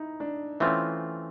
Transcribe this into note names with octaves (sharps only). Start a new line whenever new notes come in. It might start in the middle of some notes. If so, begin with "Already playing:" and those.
Already playing: D#4 E4
D4
E3 A3 C4 C#4 F4